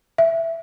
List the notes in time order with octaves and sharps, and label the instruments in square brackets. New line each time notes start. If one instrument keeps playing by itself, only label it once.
[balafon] E5